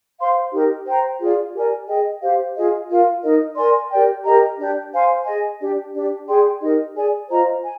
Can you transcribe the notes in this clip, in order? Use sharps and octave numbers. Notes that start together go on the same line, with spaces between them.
C5 F5 C6
D#4 G4 A#4
C5 G5 A#5
F4 G#4 D5
G4 A#4 D5 G#5
G#4 D#5 G5
G4 C5 F5
F4 G#4 D#5
F4 A#4 F5
D#4 A#4 D#5
A#4 D5 G#5 C6
G4 A#4 D5 G5
G4 A#4 D#5 A#5
D4 G4 D5
C5 F5 G#5 C6
G#4 D#5 G#5
D4 G4 D5
D4 G4 D5
G#4 D5 G5 C6
D#4 G4 A#4 D#5
G#4 D5 G#5
F4 C5 D#5 A#5
G#5